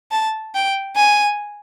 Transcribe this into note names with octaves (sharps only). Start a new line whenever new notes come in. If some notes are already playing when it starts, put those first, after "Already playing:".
A5
G5
G#5